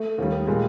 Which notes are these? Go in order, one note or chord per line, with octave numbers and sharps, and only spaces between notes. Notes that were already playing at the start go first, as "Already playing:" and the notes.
Already playing: A3
D#2 D#3 G3
A#2 G3 G#3